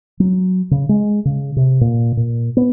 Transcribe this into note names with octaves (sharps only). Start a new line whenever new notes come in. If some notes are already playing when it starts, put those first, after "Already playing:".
F#3
C#3
G#3
C#3
C3
A#2
A#2
B3